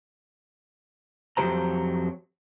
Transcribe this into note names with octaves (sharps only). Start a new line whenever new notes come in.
F2 F#3 G#3 G4 C5 A#5